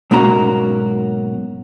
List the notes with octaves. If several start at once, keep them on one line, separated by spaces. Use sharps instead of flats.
B1 G#2 A#3 C#4 F#4 A#5